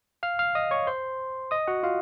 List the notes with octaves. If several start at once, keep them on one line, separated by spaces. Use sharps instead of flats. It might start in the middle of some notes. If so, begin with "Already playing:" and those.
F5 F6
F5 F6
D#5 D#6
C#5 C#6
C5 C6
D#5 D#6
F#4 F#5
F4 F5